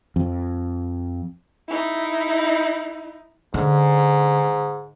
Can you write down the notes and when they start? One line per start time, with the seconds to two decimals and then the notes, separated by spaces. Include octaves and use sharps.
0.16 F2
1.68 D#4 E4
3.54 G#2 D3